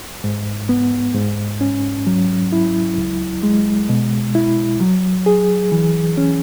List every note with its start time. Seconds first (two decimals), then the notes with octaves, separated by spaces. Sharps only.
0.24 G#2
0.69 B3
1.15 G#2
1.61 C#4
2.07 F#3
2.52 E4
2.98 C#2
3.43 G#3
3.89 B2
4.35 E4
4.80 F#3
5.26 G#4
5.72 E3
6.17 C#4